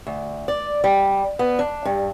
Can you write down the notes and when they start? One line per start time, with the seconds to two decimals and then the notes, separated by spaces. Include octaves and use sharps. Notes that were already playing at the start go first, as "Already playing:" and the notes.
0.07 D2
0.48 D5
0.84 G3
1.39 B3
1.59 D4
1.85 G2